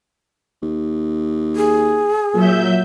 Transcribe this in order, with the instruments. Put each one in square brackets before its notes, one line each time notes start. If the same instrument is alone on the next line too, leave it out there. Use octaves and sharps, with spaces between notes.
[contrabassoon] D#2
[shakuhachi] G#4
[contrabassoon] A#2 [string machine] F#3 E5 G6